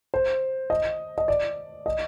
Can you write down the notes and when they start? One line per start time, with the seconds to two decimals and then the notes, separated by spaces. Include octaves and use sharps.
0.14 C5
0.70 D#5
1.18 D#5
1.28 D5
1.86 D#5